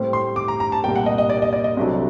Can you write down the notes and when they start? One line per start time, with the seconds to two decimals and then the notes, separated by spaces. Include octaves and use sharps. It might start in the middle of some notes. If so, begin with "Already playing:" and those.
Already playing: A2 G3 C4 G4 C5
0.13 C6
0.36 D6
0.48 A#5
0.60 A#5
0.72 A5
0.83 C2 A#2 G3 A#3 G5
0.96 F#5
1.06 D#5
1.18 D#5
1.30 D5
1.42 D#5
1.53 D5
1.64 D#5
1.77 C2 C3 F#3 A3 D4